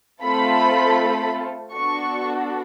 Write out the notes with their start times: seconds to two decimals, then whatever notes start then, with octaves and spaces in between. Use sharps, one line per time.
0.22 A3 C4 F4 A4 B5
1.71 B3 D4 F#4 A4 C#6